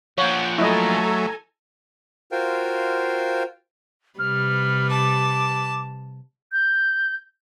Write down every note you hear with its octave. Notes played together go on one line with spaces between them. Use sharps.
A#2 F3 C#5 F#5 G5
F#3 A3 E4 A4 D#5 G#5 A#5
F4 F#4 A#4 C5 F5 G5
C3 G3 B4 F6
A5 D6
G6